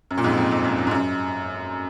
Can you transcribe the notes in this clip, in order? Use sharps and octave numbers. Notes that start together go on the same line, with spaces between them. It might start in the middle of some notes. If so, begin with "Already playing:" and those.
F#2
A#2
F2 G#2
F2
F2
F#2
F#2
G#2
F#2